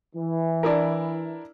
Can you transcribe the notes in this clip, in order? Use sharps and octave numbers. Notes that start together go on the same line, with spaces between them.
E3
D4 E4 A#4